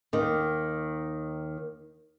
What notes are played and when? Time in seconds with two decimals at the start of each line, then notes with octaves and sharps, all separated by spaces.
0.13 D#2 D#3